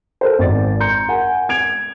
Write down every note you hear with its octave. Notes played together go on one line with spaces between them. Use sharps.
A4 A#4 C5
G#1 D5 A6
A#5 C6 G6 C#7
A#4 F#5 G#5
G#6 D7 F7